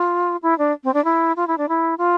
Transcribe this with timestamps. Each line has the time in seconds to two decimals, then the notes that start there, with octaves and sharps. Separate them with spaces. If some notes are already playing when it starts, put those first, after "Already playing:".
Already playing: F4
0.43 E4
0.58 D4
0.84 C4
0.94 D4
1.05 E4
1.36 F4
1.47 E4
1.58 D4
1.69 E4
1.98 F4